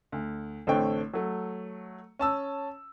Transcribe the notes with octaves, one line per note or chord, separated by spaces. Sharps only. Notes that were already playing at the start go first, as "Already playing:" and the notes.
D2
A1 D3 A3 C4 C#5 G5
F#3 A3
C#4 A5 E6